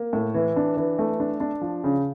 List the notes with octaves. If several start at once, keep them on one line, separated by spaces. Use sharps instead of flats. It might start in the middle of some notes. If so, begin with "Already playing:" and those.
Already playing: A#3
A2
E3
D4
E3
A3
D4
D4
F3
C#3